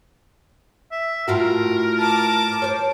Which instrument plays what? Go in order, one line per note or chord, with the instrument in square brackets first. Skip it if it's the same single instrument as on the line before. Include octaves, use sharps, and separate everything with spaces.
[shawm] E5
[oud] A2 F4 F#4 [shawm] A#4
[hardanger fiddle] A5 D6
[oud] C5 C#5